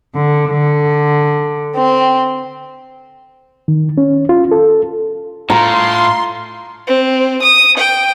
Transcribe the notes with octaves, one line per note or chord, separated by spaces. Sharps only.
D3
D3
C4
D#3
C#4
F4
A4
A2 F4 A#5 C6
C4
D#6
G5